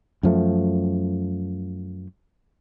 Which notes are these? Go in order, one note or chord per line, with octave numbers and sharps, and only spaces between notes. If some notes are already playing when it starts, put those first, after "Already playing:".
F#2 F3 A3